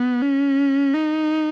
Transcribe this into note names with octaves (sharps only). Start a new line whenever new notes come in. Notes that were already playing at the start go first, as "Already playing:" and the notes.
Already playing: B3
C#4
D#4